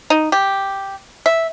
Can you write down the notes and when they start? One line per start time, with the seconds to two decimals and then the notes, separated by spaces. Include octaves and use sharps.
0.10 D#4
0.32 G4
1.26 E5